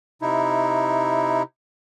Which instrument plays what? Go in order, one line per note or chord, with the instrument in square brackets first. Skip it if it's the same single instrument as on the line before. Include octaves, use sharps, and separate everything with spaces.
[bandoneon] C3 D#4 E4